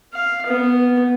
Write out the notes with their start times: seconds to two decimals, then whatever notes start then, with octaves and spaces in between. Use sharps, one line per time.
0.13 F5
0.47 B3